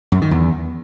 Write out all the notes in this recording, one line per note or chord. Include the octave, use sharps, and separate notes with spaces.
F#2
D#3
E2